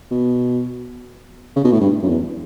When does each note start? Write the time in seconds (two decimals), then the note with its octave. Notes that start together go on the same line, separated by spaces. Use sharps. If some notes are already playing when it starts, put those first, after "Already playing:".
0.11 B2
1.56 C#3
1.64 B2
1.73 A2
1.81 G2
2.02 F#2
2.09 E2